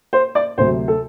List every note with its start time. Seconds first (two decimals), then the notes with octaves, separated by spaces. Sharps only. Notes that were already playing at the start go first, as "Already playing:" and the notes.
0.13 C5
0.35 D5
0.58 D2 C3 F#3 C5
0.88 A4